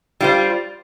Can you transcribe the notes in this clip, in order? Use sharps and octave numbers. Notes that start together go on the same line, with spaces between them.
G3 F4 C5